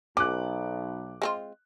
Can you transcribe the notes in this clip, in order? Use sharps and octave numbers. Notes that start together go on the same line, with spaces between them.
B1 C#4 D6 F#6
G#3 C4 F4